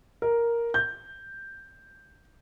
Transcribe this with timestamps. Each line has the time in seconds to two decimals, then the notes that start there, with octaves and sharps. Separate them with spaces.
0.22 A#4
0.74 G6